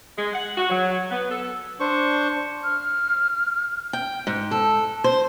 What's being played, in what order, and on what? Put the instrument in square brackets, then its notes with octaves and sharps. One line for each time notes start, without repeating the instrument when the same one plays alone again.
[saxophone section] G#3
F#5
F#4
F#3
B3
A4
[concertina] D4 C5 C#6
[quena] F6
[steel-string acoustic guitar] G5
G#2
A4
C5